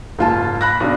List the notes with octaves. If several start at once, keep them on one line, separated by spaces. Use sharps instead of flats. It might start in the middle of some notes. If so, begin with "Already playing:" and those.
F#1 G#2 F4 A5
B5 F#6 A#6
B1 D4